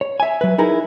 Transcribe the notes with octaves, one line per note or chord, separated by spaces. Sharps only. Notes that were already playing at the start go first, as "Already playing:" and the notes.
C#5
E5 G#5
F#3 B4
D#4 E4 G#4 A#4